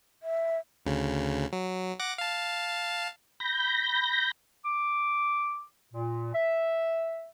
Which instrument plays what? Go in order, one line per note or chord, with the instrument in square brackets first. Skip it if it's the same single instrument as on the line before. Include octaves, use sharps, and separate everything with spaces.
[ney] E5
[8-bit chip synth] D2 C#3
F#3
F#5 D6 A#6
F5 A5
[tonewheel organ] B5 G6 A#6
[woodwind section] D6
A#2
E5